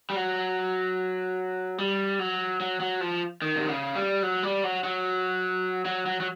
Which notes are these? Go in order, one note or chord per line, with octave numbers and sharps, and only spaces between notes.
G3
F#3
G3
F#3
F#3
F#3
F3
D#3
C3
C#3
G3
F#3
G3
F#3
F#3
F#3
F#3
F#3